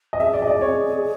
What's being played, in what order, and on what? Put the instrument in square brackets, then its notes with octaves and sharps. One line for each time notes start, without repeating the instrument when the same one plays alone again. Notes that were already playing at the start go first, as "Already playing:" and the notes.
[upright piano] D#5
[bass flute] G#4 [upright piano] E5
[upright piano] D5
D#5
D5
C#5